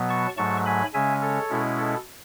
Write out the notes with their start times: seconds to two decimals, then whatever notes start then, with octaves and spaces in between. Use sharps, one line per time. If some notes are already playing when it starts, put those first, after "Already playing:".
Already playing: B2 F#3 B3
0.09 A5 C#6
0.38 G#2 F#3 A3 A5 C#6
0.66 G#5 B5
0.94 C#3 G#3 C#4 E5 G#5
1.22 A4 C#5
1.50 B2 G#3 C#4 E4
1.78 A4